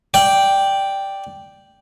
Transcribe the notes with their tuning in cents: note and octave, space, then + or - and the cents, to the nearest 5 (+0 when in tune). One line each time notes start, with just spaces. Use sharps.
D5 +0 G5 +0